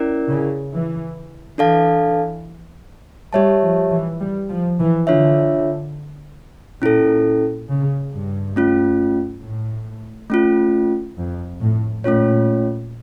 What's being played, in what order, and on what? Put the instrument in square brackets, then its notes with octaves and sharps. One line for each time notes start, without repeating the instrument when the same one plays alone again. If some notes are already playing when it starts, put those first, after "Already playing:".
Already playing: [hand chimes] C#4 E4 A#4 D5
[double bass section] C#3
E3
[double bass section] E3 [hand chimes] D4 A4 D5 F5 A5
[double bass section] G3 [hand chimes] G4 C#5 E5 A5
[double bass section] F3
E3
G3
F3
E3
[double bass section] D3 [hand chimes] D4 F4 C#5 E5
[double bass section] A#2 [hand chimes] C#4 E4 A4
[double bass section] C#3
G2
[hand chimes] A3 C#4 F4
[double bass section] A2
[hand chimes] A3 C#4 F4
[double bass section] F2
A2
[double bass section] A#2 [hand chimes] A3 C#4 F4 C#5